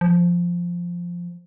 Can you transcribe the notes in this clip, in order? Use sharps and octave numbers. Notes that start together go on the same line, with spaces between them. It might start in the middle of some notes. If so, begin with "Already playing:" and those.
F3